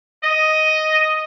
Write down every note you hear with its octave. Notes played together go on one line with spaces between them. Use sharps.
D#5